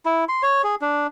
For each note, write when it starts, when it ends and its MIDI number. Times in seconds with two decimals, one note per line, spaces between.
0.05 0.24 64
0.29 0.42 84
0.43 0.62 73
0.64 0.75 68
0.81 1.07 62